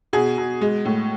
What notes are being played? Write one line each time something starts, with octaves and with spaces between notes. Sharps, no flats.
B2 G#4
B2
G#3
A2